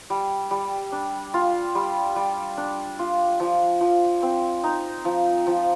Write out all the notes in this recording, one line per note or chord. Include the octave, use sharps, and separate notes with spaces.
G3
G3
D4
F4
G3
G3
D4
F4
F3
F3
C4
D#4
F3
F3